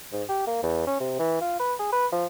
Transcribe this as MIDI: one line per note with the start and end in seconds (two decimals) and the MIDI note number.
0.12 0.23 44
0.29 0.43 67
0.47 0.61 58
0.63 0.87 40
0.87 0.98 61
1.00 1.17 48
1.19 1.36 52
1.41 1.58 65
1.60 1.74 71
1.79 1.91 68
1.92 2.07 71
2.12 2.26 53